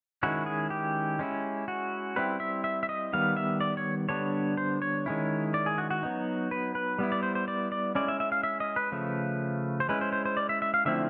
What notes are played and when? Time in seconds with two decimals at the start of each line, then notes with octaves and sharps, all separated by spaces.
0.23 D#3 G#3 C#4 E4 F#4
0.46 G#4
0.70 G4
1.19 G#3 C#4 E4
1.68 F#4
2.16 G3 C4 E4 B4
2.40 E5
2.64 E5
2.83 E5
2.89 D#5
3.13 D#3 G3 B3 F5
3.37 E5
3.61 D5
3.77 C#5
4.09 D3 G3 B3 D4 C#5
4.57 C5
4.82 C#5
5.06 D#3 G#3 C#4 E4
5.54 D5
5.66 G#4
5.78 F#4
5.91 F#4
6.03 F#3 B3 D#4
6.51 B4
6.75 B4
6.99 G3 B3 E4
7.12 D5
7.23 C5
7.35 C5
7.48 D5
7.72 D5
7.95 G#3 C#4 E4 D5
8.08 E5
8.20 E5
8.32 F5
8.43 E5
8.60 D#5
8.76 B4
8.92 C#3 F3 A3
9.80 C5
9.89 G#3 C#4 E4 B4
10.01 C5
10.13 C5
10.26 C5
10.37 D5
10.49 E5
10.62 E5
10.74 F5
10.85 D3 F3 A3 C4 E4 E5